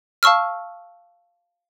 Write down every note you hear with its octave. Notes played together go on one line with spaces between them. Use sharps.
F5 A5 C#6 E6 F6